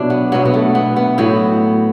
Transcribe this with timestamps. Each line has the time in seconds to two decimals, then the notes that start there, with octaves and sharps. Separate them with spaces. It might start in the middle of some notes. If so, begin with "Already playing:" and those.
Already playing: B2 F#3 D4 E4
0.10 B3
0.32 B2 F#3 B3
0.45 B3
0.54 A3
0.75 B3
0.96 B3
1.18 A2 F#3 B3